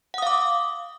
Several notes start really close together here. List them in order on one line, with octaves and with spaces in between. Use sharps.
F#5 D#6 F5 D6